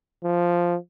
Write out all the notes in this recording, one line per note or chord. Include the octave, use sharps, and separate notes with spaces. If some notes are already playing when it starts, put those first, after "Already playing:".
F3